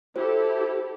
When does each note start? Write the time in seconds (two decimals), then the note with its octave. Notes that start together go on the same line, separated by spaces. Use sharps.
0.16 E4 F#4 G4 A4 C5